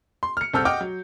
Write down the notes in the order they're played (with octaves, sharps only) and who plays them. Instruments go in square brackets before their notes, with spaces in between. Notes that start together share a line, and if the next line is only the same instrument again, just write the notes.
[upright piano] C6
F6 C#7
C2 C4 A4 E6 F6 G6
D#5 F#5 G5 D6 F6
F#3